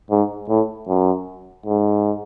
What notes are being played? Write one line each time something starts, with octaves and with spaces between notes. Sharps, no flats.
G#2
A2
F#2
G#2